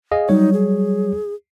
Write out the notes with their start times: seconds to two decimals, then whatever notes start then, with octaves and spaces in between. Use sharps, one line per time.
0.11 G#4 D#5 F5
0.29 F#3 G3 D#4 C#5
0.53 G#4